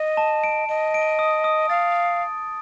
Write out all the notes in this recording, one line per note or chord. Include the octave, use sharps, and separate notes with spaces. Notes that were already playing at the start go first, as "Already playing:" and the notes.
Already playing: D#5
A5
D7
D#5 D7
D7
D#6
D#6
F5 A6